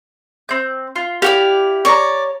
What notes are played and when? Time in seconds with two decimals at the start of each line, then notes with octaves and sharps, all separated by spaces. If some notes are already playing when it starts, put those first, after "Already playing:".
0.49 C4 G6
0.96 F4
1.22 E4 F#4 G4 D5 F5
1.85 C#5 D5 A#5 C#6